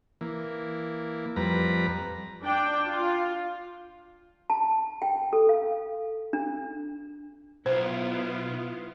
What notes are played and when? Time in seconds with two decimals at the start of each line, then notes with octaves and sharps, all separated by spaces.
0.21 E3 A#3
1.36 F2 G3 B4 A#5
2.42 D4 G5
2.86 F4
4.50 A5
5.02 G5
5.33 A4
5.49 F5
6.33 D4
7.66 B1 B3 E4 F4 C5